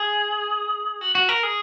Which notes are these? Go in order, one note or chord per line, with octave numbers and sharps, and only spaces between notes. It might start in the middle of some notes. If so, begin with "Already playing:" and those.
Already playing: G#4
F#4
F#4
A#4
G#4